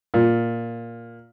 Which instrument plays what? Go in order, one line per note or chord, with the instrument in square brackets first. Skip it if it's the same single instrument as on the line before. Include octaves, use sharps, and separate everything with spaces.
[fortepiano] A#2